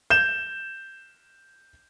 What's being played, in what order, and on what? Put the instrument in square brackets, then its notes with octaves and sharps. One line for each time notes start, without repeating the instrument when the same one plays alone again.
[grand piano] G6 E7